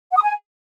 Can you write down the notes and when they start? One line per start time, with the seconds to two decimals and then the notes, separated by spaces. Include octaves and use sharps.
0.11 F#5
0.17 D#6
0.22 G#5